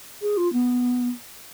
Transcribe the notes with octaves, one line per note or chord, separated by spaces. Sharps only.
G#4
F4
B3